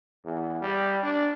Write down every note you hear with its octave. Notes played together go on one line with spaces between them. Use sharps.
E2
G3
D4